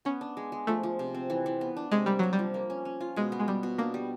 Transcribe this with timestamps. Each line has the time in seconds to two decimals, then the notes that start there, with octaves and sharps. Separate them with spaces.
0.05 B3 C#4
0.21 D4
0.37 G#3
0.52 G#3
0.67 F3 A3
0.83 F3
0.99 C3
1.15 C4
1.30 E3
1.46 E3
1.61 B3
1.77 D4
1.92 C3 G#3
2.06 G3 A#3
2.19 C3 F#3
2.33 G3
2.39 F3
2.54 A#3
2.70 C#4
2.85 C#4
3.01 F4
3.16 B2 G#3
3.32 B3
3.40 G#3
3.48 G3 B3
3.63 B2
3.78 A#3 D4
3.94 G3